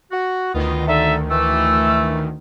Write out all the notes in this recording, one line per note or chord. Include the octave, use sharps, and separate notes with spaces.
F#4
D2 D#3 B3 F4 D#5
D3 D#4 A4 E5
E3 A3 E6